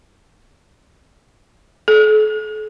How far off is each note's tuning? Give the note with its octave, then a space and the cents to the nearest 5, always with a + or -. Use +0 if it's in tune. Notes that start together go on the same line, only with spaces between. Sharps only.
A4 -40